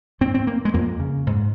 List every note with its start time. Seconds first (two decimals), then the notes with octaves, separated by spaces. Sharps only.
0.21 G#2 C4
0.34 C4
0.47 A#3
0.65 G#3
0.74 F2 A#3
1.00 C#3
1.27 G#2